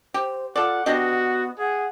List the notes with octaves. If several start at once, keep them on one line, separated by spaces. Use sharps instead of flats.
G4 C5
F4 A4 D5 F#5
B3 D4 F#4 G4 D#5
G#4 F#5